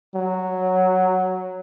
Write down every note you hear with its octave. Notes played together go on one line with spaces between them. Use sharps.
F#3